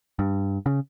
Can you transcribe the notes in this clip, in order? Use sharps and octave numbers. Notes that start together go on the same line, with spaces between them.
G2
C#3